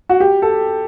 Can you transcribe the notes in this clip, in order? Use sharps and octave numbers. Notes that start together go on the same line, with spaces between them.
F#4
G4
A4